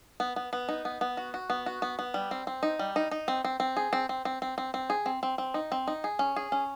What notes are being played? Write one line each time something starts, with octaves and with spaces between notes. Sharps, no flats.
B3
B3
B3
D#4
B3
B3
F#4
F#4
B3
F#4
B3
B3
G3
C4
C4
D#4
G3
D#4
D#4
C4
C4
C4
G#4
C4
C4
C4
C4
C4
C4
G#4
C4
C4
C4
D#4
C4
D#4
G#4
C#4
G#4
C#4